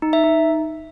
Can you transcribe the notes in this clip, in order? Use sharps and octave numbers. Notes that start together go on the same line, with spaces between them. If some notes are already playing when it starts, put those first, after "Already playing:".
D#4
E5
D#4